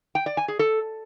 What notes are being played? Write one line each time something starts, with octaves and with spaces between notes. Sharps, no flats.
G5
D5
G#5
G#4
A4